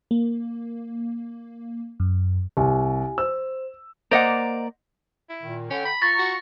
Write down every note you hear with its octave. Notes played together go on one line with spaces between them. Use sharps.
A#3
F#2
C2 G4 G#5
C5 E6
A#3 C5 D5 D#5 F#5 A#5
E4
A#2 D#3
D3 C#4 G5
B5
F4 A#5 C#6 A6 A#6
F#4